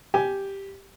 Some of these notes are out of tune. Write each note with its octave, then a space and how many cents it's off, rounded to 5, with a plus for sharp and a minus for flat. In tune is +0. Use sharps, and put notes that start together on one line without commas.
G4 +0 G#5 +10